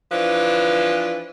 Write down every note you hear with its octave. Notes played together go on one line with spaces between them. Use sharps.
E3 F3 D4 B4